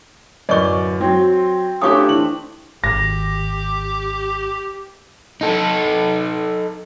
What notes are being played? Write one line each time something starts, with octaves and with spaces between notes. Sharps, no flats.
D1 F#2 D5 D#5 C#6
F#3 C4
A3 C#4 D4 F4 G4 C#6 D#6
E3 F#7
G#1 G4 A#6
D#4 A4